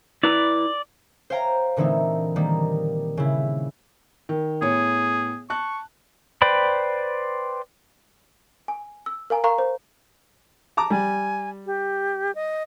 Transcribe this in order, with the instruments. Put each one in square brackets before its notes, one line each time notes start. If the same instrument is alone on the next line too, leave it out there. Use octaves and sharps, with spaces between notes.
[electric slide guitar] E4 B4 A#5 [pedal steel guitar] D5
[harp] C5 C#5 F5 G5 A#5
A#2 D3 E3 A3 C4 D#4
D#3 G3 A#3
C#3 E4
[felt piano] D#3
[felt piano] A2 B3 C#5 [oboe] G#4
[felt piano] A5 F#6 [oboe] C#6
[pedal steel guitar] B4 C5 D5 G5 B5
[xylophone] G#5
E6
A#4 F5 G#5 A#5
A#4 F5 A#5 C#6
C5
[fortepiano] A5 A#5 D6
[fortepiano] G3 [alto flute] G#5
[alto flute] G4
D#5